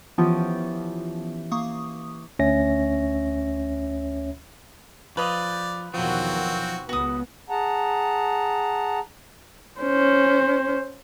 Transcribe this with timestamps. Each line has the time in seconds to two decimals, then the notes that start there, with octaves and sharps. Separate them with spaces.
0.18 E3 F3 B3 C#4 F4 G4
1.51 A#3 C#6 D#6
2.39 D2 C#4 C#5 E5 A#6
5.17 F3 B4 D5 D#5
5.94 E2 B2 D#3 F3 F#3 C4 F#4
6.89 C#2 B3 F#4 D#6
7.50 G#4 F#5 A5 A#5
9.81 C#4 C5